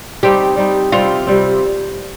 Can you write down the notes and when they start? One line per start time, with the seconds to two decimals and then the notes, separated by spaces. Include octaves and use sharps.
0.23 G3 C4 D#4 G4
0.57 G3 C4 D#4
0.92 C3 G3 C4 F4
1.27 C3 G3 C4